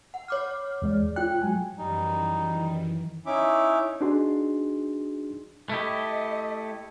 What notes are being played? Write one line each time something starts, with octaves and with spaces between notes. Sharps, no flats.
F#5
C#5 D6 F6
E2 G#3 D5
F4 G5 F#6
F#3 G#3 G#5
F#2 D#3 E3 G3 D#4
C#4 D#4 E4 E5 D6
D4 D#4 F#4 G#4 C6
A3 E4 G4 D#5